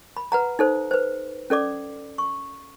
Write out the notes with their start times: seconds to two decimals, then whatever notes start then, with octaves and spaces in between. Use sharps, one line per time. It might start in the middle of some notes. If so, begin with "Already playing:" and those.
0.17 B5
0.32 B4 F#5 A#5
0.59 D#4 A4 C5
0.91 B4 C5
1.50 C#4 A4 D5 D6
2.18 C#6